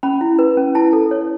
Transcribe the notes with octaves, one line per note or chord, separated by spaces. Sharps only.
C#4 B5
E4
B4
C#4
E4 A5
A4
C#5